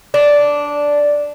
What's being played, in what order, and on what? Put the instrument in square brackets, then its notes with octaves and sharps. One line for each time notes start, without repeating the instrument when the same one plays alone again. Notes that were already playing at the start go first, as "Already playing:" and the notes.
[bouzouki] D4